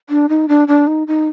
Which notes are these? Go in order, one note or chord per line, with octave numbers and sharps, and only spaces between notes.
D4
D#4
D4
D4
D#4
D#4